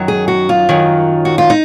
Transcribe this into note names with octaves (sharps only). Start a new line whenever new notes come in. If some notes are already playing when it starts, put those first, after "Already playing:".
Already playing: F#2 D#3 F#3
G#4
F#4
F4
F#2 D#3 F#3
F#4
F4
D#4